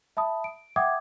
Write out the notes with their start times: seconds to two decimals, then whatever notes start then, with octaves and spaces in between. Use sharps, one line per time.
0.17 E5 A5 B5 D#6
0.44 D7
0.76 E5 F#5 G5 D6 D#6 G#6